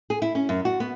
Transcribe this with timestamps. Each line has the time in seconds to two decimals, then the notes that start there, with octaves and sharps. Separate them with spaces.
0.10 G#4
0.22 E4
0.35 C#4
0.49 F#2
0.65 F#4
0.80 B3